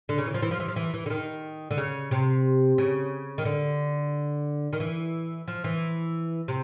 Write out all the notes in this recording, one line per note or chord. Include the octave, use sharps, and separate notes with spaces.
D3
C#3
E3
F3
E3
F3
E3
F3
E3
E3
D3
D#3
D3
C#3
C3
C#3
D#3
D3
D#3
E3
F3
E3
C3